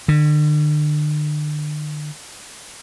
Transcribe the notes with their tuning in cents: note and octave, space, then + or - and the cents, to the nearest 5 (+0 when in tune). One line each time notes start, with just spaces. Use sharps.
D3 +40